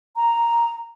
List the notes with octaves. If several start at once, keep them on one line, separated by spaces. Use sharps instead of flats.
A#5